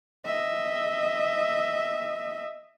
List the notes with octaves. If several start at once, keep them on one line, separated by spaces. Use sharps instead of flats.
D#5 E5